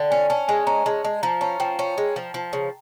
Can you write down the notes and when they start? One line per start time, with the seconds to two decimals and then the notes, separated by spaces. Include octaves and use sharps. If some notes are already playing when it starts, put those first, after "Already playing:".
Already playing: D3 G5
0.11 C#4 G#5
0.30 C#4 A5
0.48 G#3 G#5
0.67 C#4 A#5
0.86 G#3 A5
1.04 G#3 A5
1.23 F3 A#5
1.41 C#4 A5
1.60 F3 G5
1.79 C#4
1.98 G#3
2.16 F3
2.34 F3
2.53 C#3